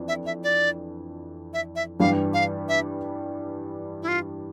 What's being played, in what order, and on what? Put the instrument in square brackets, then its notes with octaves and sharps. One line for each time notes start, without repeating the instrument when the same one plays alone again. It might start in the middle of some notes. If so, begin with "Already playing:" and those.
Already playing: [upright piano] F2 E3 D4
[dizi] E5
E5
D5
E5
E5
[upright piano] G2 E3 G3 D4 G4 [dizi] F5
[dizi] F5
E5
E4
F4